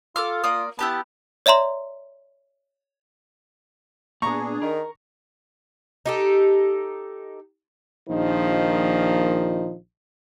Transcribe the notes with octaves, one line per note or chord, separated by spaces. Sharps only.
F4 A4 D6 F6
A#3 D5 D#6
B3 E4 G4 A5
C#5 D5 E5 A#5 C6
A#2 B3 D4 G#4 A#5 C#6
D#3 A#4
D#4 G4 A4
A#1 A#2 D#3 F3 D#4